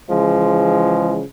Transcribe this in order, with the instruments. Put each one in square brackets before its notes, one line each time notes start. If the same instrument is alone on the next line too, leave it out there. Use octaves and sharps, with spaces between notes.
[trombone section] C#3 E3 F3 G#3